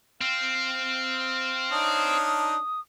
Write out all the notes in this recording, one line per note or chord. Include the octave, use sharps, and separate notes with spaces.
C4 F5
D4 D#4 C#5 D#6